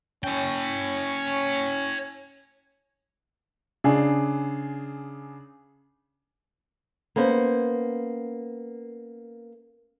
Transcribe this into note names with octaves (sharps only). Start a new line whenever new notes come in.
C#4 C#5 G5
C#3 D4 G#4
A#3 B3 C#4 C5